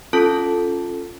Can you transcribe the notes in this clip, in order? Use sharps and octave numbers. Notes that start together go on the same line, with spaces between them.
C#4 F4 A4 A5